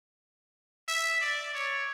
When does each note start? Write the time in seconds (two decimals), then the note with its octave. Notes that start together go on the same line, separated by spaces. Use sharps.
0.88 E5
1.21 D5
1.54 C#5